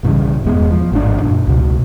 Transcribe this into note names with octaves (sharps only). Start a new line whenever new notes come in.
B1 G2 C#3 E3
D#1 E2 G#3 B3
F3
G#1 A2 D4
F#2 A#2
C#2 B2